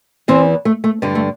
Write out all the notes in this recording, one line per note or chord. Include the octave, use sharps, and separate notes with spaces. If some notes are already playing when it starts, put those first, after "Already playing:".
E2 E3 C4
A3
A3
G2 D3 G3
A3